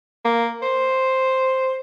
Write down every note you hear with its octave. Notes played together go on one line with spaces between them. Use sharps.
A#3
C5